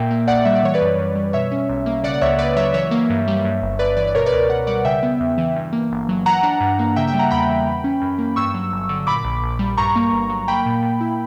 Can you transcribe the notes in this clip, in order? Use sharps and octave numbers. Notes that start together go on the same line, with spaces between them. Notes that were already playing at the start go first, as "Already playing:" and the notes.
Already playing: A#2 A#3 E5 G5
A#3
A#1 D5 F#5
G3 E5
D5
E3 C#5
B4 D5
F#2
F#2
G3
B2 C#5 E5
C#4
B1
A#3
C#3 D5 F#5
F#5
C#2 C#5 E5
C#2 B4 D5
F#3 C#5 E5
E3 C#5 E5
A#3
G2
G3
G2
G1
G1 B4 D5
E3 B4 D5
D5
B2 A#4 C#5
B4 D5
C#2
C#2 D5 F#5
G3 D5 F#5
C#3 E5 G5
B3
E2
E3
G2
A#3
G1
F#3
E3 F#5 A#5
D4
G2
A#3
C#3 E5 G5
E5 G5
G3
F#5 A#5
E2 G5 B5
E3
E3
C#4
F#2
A#3
G2 C#6 E6
F#3
G1
D3
A#2 B5 D6
A#1
A#1
G3
G2 A#5 C#6
A#3
G1
F#3
A#3 G5 B5
A#2
A#2
E4